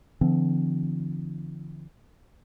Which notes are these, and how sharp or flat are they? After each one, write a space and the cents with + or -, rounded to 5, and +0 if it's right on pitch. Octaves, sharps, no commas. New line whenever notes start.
D3 +0 F3 -40 C4 -35